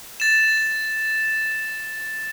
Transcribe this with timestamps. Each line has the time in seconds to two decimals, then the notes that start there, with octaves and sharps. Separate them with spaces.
0.20 A6 E7